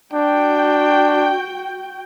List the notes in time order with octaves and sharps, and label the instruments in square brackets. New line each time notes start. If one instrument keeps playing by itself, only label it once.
[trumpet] D4 [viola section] F#4 G5